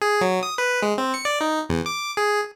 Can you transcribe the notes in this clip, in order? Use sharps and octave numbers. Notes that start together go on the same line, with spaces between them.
G#4
F#3
D#6
B4
G#3
C4
C#7
D5
D#4
E2
D6
G#4